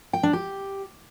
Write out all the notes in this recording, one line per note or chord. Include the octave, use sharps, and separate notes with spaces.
G5
D4
G4